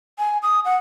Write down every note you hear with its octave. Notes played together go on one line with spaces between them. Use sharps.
G#5
D#6
F#5